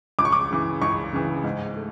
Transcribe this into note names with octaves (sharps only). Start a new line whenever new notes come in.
C#2 D6
C#6
D6
C#3 E3
C#2 C#6
C#3 E3
G#2
A3